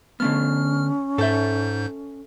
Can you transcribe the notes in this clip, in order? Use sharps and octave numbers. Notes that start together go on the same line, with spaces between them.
D3 A3 B3 C#4 F6
G#2 A4 E5 G6